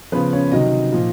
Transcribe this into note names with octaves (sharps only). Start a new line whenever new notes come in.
C#3 F3 B3 B4
C#4 C#5
C3 D#3 F#3 D#4 D#5
A#2 F3